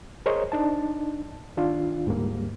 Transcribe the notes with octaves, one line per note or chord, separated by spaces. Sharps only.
G#4 A#4 C5 C#5 D#5
D4 D#4 A5
D#3 D4 F4
D2 G#2 G3 A#3